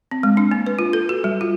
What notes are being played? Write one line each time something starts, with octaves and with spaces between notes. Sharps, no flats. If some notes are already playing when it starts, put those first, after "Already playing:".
C4
G#3
D4
A#3
B4
F4
A4
F#4
G3
F4